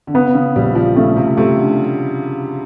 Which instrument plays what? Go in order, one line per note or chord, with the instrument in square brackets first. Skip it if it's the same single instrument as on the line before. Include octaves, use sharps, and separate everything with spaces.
[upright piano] D3
[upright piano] C#3 [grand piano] B3
[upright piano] C#3
[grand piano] A#1 [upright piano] G3
[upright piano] F3
[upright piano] C#3 [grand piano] A3
[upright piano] C3
[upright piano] C3 [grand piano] A3
[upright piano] D3